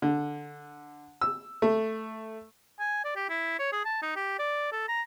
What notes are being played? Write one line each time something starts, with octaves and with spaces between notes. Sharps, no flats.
D3
E6
A3
G#5
D5
G4
E4
C#5
G#4
A5
D#4
G4
D5
A4
A#5